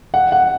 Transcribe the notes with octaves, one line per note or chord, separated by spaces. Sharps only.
F#5
F#5